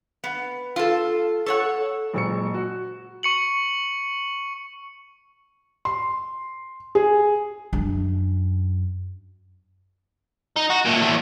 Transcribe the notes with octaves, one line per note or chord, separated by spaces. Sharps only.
B3
F4 A4
A4 C#5 F#5
F#1 A#2 G#3 C#6 E6 C#7
F#4
C#6 C#7 F#7
C6
G#4
F#2 D4
D#4
F#4
A#2 A3
E2 A3